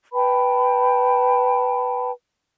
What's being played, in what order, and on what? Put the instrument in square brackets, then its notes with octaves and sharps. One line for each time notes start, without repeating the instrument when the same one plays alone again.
[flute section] B4 G5 A5 B5